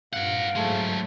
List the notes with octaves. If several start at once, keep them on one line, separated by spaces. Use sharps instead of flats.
G2 A#4 F5 F#5
G#2 F#3 G#3 A3